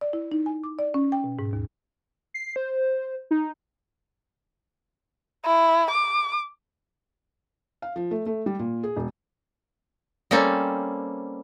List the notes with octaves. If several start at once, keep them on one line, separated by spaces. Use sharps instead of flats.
D5
E4
D#4
G#5
D6
D5
C#4
G5
B2
G#2
D#2
C7
C5
D#4
E4
D6
F5
F3
A3
A3
G3
A#2
G#4
E1
G3 A#3 C4 C#4 A4